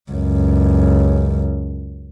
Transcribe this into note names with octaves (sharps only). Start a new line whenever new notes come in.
C#2 F#2